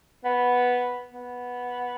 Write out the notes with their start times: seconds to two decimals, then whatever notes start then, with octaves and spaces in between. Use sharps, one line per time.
0.24 B3
1.11 B3